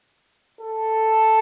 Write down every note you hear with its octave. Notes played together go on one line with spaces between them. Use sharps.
A4